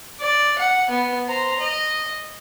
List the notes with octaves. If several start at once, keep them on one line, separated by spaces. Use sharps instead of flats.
D5
F#5
B3
C5 A#5
D#5